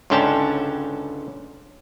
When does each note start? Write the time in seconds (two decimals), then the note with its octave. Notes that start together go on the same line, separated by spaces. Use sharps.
0.10 C#2 G#2 D3 C#4 G5 A5